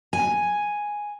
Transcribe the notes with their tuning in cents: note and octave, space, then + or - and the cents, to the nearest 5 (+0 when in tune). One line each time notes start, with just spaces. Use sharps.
G#5 +0